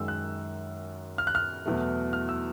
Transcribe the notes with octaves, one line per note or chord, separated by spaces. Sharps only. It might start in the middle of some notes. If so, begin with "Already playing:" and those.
Already playing: F#2 D#3 G#3 E6
F#6
F6
F#6
F6
E2 B2 F#3 A3
F6
E6